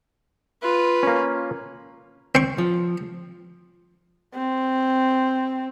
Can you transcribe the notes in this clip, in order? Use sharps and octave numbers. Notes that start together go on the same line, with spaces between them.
F4 B4
A#3 C#4
C4 C#6
F3
C4